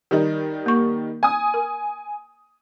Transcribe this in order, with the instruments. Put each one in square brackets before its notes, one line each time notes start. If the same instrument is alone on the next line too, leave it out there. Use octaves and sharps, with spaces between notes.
[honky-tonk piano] D#3 G3 D#4
[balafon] A#3 C#6
[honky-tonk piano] G#5 D#6
[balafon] A#4